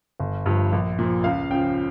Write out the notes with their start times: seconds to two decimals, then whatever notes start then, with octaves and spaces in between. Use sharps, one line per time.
0.20 G1
0.46 G2 F3
0.72 A#1
0.99 A#2 F3
1.24 C#2 F5
1.51 C#3 F3 G5